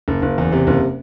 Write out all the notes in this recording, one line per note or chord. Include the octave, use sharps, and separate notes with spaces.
F#1
F#1
E2
C3
F#1